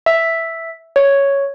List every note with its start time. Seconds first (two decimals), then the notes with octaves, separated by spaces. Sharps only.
0.06 E5
0.96 C#5